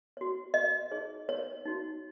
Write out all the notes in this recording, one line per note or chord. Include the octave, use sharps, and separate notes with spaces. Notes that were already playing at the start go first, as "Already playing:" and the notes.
F#4 C#5
D#5
D#4 G#4 C#5
C#5
D#4 F#4 C#5